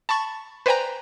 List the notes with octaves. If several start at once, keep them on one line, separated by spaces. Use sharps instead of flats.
A5 B5 C#6 A6
B4 C5 D5 G5 G#5 A#5